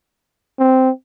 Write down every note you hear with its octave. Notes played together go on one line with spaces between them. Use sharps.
C4